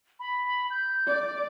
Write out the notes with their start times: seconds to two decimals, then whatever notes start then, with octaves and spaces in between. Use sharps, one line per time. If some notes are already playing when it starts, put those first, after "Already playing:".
0.20 B5
0.71 G6
1.07 D5